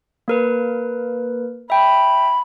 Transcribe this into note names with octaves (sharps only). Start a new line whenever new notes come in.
A#3 A#4 B4
E5 G5 B5